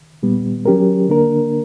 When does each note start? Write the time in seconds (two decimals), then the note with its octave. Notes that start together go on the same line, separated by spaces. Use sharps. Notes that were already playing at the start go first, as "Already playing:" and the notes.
0.23 A#2 G3 B3
0.66 F#3 C#4 G4 A#4
1.09 D3 A#3 D4 A#4